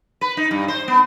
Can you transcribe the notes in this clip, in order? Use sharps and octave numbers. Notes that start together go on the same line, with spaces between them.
B4
D#4
G2
C5
B3